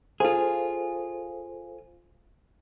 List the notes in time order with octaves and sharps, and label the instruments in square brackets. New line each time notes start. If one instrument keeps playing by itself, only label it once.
[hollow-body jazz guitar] F4 G#4 [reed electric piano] A4 C5 F5